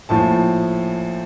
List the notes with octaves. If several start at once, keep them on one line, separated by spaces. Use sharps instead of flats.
A#1 A2 F3 A5